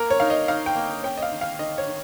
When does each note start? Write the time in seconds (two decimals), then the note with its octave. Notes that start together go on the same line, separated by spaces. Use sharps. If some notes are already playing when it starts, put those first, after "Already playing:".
Already playing: A#3 A#4
0.10 C#5
0.20 D#4 F5
0.30 D#5
0.48 D#4 F5
0.66 G5
0.75 A#3
1.03 C#4 G5
1.18 D#5
1.22 F5
1.32 D#3
1.41 F5
1.59 D#3 D#5
1.78 C#5
1.87 D#3